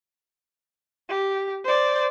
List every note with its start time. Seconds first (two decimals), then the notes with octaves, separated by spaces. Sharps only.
1.10 G4
1.65 C5 D5